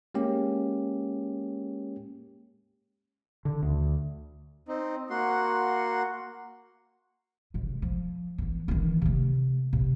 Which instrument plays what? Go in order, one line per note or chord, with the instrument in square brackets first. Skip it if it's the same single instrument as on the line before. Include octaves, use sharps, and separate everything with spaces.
[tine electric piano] G#3 A#3 C#4 G4
[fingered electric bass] D3
D2
[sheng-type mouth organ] C4 D#4
A#3 F#4 F#5 C6
[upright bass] C3 G#3
F3
E3 B3
D#3 E3
C3 A3
C3